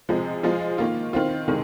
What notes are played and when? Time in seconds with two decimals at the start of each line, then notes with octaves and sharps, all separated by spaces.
0.09 C3 F3 G#3
0.43 F3 G#3 F4
0.78 D#3 A#3 F4
1.13 D#3 C4 F4
1.48 C3 D#3 G#3